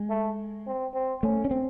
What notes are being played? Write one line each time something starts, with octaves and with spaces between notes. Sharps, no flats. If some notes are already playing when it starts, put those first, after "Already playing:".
Already playing: G#3
A3
C4
C4
A3 C#4
C#4
C4